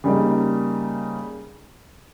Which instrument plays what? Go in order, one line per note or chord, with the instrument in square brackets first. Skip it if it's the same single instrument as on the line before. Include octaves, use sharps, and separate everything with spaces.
[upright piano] C#3 G3 A#3 D#4